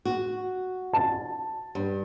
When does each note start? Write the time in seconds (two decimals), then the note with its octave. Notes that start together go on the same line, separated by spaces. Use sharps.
0.05 F#4
0.93 A5
1.75 G2